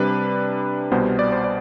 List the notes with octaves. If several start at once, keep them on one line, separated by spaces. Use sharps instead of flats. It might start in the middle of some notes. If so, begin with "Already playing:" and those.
Already playing: C3 G3 D4 B4
C2 B2 G3 B3 C5
D5
C5
D5